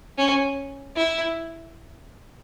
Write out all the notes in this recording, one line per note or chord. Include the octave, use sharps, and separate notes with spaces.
C#4
E4